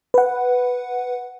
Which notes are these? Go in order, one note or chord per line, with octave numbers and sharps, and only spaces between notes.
B4 F#5